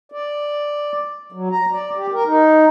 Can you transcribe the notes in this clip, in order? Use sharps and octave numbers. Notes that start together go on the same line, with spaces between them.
D5
F#3
A#5
D5
G4
A#4
D#4